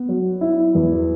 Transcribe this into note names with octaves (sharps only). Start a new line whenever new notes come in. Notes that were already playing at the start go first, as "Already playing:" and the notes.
Already playing: B3
F#3
E4
E2